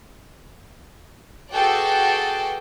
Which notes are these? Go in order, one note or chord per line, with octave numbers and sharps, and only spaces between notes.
F#4 G#4 A4 B4 D5 G5